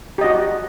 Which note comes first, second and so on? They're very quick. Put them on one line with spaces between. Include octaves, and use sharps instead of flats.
G4 D#5 F#4